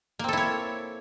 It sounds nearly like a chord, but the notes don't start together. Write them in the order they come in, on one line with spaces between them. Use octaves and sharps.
A#3 C4 A4 E4 C#5